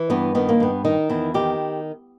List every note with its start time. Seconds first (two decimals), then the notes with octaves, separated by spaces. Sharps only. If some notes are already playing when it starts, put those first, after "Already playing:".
Already playing: E3
0.10 G2 B3
0.35 D#3 B3
0.49 A#3
0.60 G2 B3
0.85 D#3 D#4
1.10 E2 E4
1.34 D#3 G4